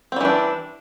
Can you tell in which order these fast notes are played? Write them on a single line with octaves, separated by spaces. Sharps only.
C4 G3 E3 D4